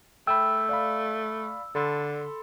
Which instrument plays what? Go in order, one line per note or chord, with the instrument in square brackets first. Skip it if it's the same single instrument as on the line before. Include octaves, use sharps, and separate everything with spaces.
[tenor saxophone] A3 [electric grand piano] G5 B5 [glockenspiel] E6
[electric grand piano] D5 F5 B5
[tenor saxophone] D3 [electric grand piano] A4 B5 C6